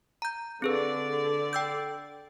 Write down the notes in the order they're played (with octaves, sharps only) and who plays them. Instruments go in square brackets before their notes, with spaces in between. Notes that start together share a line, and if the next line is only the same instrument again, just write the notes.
[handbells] A#5 G6
[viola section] D3 D5 [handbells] C4 G#4 B4
[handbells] G5 E6 G6